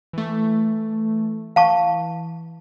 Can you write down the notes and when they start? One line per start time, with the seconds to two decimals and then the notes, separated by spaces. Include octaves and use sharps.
0.13 E3 A3
1.56 E3 F5 A5 C#6